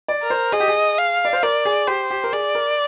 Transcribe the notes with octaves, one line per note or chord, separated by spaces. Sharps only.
D5
A#4
C5
G#4 D#5
G4
G#4
F5
D5
C5
A#4 D5
G#4
G4 C5
G4
A#4
G#4 D5
A#4